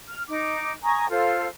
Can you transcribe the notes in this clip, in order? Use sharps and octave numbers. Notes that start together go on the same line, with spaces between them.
F6
D#4 D6
G#5 A#5 C#6 D#6
F4 A4 C5 F5